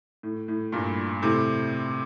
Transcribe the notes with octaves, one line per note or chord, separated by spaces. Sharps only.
A2
A2
G2 A#2
A2 C3